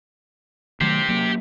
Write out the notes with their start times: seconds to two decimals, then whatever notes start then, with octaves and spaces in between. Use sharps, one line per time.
0.81 D#3 F#3 A3 G4 C5
1.09 F#3 A#3